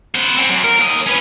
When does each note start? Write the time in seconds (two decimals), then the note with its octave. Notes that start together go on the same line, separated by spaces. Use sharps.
0.14 B3 C5
0.36 C4 C#4
0.49 F#2
0.64 A#4
0.78 D#2 D#5
1.06 C#4 B4